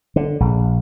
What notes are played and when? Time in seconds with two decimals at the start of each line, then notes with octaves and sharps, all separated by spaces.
0.16 D3
0.40 A#1